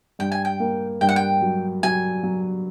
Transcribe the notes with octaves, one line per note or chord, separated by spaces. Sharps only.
G2 G5
G#5
G5
A#3
G2 G5
F#5
G5
F#3
F#3 G#5
F#3